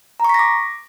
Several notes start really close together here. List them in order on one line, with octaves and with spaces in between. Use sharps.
A#5 C#6 B6 A#6 D6